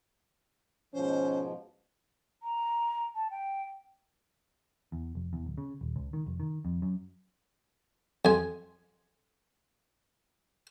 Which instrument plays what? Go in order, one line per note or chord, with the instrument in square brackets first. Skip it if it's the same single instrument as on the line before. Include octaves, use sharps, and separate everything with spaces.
[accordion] G#2 B2 F3 [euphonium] C#4 [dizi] C5
[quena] A#5
A5
G5
[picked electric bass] E2
F1
E2
D1
C#3
D#1
C#2
D#3
F1
D#3
F2
F#2
[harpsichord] F2 G#5